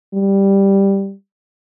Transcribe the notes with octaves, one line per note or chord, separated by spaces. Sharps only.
G3